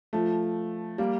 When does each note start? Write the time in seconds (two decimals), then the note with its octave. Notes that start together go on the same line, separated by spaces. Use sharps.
0.13 F3 A3
0.98 G3 A#3